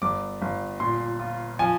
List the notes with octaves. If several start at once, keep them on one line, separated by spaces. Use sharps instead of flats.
G1 D6
G1
A#2 C6
F4
F3 G#5